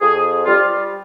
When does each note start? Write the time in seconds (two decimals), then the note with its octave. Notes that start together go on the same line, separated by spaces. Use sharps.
0.01 F2 G#4
0.46 G3 F4